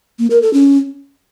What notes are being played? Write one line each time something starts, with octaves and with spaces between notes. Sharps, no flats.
A#3
A#4
A4
C#4